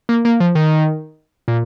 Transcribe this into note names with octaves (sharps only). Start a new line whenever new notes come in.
A#3
A#3
F3
D#3
A#2